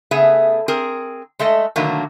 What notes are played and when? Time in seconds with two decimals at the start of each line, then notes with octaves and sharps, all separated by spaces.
0.11 C#3 A3 B3 G#4 E5
0.68 C4 G#4 A#4
1.39 G#3 A3 A4 D#5
1.76 B2 D3 D#3 F#3 A3 A#3